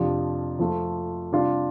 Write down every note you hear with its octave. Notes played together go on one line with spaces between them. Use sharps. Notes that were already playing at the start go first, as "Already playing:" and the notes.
Already playing: F2 C3 F3 D4 F4
F2 F3 A3 F4
C3 G3 D4 F4